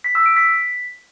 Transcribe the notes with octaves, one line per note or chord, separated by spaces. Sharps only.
B6
E6
D7
B6